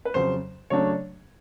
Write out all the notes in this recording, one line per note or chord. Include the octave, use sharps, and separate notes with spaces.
B4
F2 C#3 F#3 C5
C#3 F#3 A3 D4 C#5